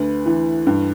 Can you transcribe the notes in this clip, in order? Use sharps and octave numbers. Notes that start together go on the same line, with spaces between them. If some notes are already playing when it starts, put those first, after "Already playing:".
Already playing: D2 B4
E3
G2